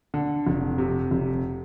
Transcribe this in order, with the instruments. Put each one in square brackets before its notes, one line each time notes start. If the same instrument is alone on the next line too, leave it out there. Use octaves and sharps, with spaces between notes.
[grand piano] D3
F1
C3
F1